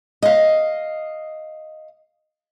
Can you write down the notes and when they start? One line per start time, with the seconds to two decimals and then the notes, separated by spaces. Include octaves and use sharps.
0.23 D#5 F5